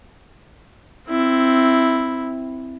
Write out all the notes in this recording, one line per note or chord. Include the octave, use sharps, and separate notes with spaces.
C4 E4